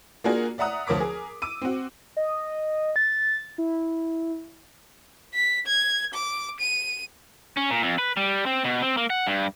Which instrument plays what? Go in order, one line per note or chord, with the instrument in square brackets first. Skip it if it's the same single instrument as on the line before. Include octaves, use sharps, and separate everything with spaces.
[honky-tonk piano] A#3 D4 F4 F#4 G#4 A#4
D5 E5 F#5 A#5 D#6 F#6
D2 F3 A#4 C#5 D6 B6
G#4 A#4
D6 E6 D#7
C4 F#4
[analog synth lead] D#5
A6
E4
[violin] B6
G#6
D6
D#7
[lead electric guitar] C#4
A#2
F2
B4
G3
C4
B2
C4
A#3
F#5
G2